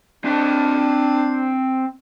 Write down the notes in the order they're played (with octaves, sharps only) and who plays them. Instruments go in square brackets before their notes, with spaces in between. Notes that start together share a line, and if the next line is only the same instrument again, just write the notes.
[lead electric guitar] C4 A5 [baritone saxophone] D4